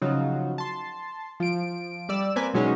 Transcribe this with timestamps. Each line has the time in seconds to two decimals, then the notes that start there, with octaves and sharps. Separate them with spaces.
0.02 C#3 F3 F#3 D#4 F4 F#4
0.58 A5 C6
1.40 F3 D7
2.09 G3 D5 E6 E7
2.36 A#3 C4 B4 G#5
2.54 B2 F#3 G#3 C#4 D#4